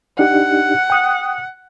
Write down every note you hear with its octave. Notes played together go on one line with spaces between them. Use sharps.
D4 D#4 G4 F#5
G5 D#6 F#6